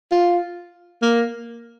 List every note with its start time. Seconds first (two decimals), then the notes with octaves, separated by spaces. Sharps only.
0.12 F4
1.02 A#3